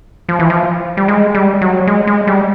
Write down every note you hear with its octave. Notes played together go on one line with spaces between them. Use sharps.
F3
E3
F3
G3
G#3
G3
F#3
G#3
G#3
G3